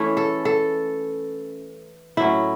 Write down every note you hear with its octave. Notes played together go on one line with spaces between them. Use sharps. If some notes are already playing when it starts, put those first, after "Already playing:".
Already playing: E3 A3 C#4 E4
A4
A4
A2 F#3 C#4 E4